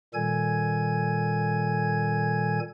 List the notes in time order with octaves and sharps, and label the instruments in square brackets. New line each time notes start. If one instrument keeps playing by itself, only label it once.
[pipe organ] A#2 D#3 G3 A4 G#5 G#6